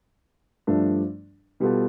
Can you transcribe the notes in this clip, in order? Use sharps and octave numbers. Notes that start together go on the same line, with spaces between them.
G2 F3 A3 D4
B2 G3 B3 F4 A4